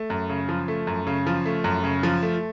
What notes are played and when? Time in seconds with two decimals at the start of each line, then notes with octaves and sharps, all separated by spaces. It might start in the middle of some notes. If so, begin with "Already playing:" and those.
Already playing: A3
0.10 F#2
0.30 C#3
0.49 F3
0.68 A3
0.87 F#2
1.07 C#3
1.27 F3
1.46 A3
1.64 F#2
1.84 C#3
2.03 F3
2.22 A3